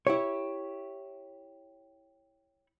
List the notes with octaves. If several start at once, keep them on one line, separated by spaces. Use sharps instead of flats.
E4 G4 C#5